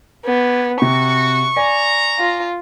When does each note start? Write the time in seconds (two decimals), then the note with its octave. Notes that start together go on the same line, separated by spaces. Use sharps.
0.25 B3 D4 G4 G#5
0.82 C3 F#4 C#6
1.56 D5 G#5 A#5
2.19 F4